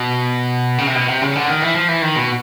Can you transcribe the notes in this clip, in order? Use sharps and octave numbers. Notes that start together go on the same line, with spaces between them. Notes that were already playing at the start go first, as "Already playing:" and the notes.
Already playing: B2
C#3
C3
B2
C3
C#3
D3
D#3
E3
F3
E3
D#3
B2